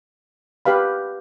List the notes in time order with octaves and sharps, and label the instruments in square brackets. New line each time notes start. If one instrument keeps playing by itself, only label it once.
[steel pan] G4 B4 F5 B5